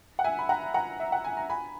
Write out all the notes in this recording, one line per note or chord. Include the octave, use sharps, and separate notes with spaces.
F#5
E5 G#5
B5
F#5 A#5
F#5 A#5
E5
F#5
G#5
A#5
G#5 B5